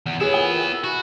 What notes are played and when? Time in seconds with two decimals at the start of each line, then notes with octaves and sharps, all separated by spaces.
0.06 E2
0.20 B3 E4 G#4 B4 C#5 G#5
0.34 F4 A#4 G#5
0.63 E6
0.84 F#4 B5